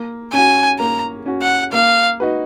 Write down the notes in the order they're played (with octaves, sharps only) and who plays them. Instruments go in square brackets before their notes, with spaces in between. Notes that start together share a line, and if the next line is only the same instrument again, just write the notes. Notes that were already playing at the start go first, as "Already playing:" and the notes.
Already playing: [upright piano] A#3
[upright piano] C#4 F#4 [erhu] G#5
[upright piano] A#3 [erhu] A#5
[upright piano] C#4 F#4
[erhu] F#5
[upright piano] A#3 [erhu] F5
[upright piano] D#4 F#4 B4